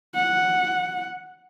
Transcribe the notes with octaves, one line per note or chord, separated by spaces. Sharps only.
F#5